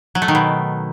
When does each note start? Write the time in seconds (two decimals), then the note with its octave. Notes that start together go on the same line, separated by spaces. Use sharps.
0.15 F#3
0.22 A3
0.28 D#3
0.35 B2